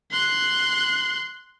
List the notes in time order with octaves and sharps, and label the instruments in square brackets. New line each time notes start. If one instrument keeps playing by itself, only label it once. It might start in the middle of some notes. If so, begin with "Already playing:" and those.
[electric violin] C6 F#6